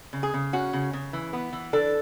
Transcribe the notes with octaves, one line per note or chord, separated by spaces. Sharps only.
C#3
G#4
C#3
C#4 F#4
C#3
C#3
E3
B3
E3
D4 A4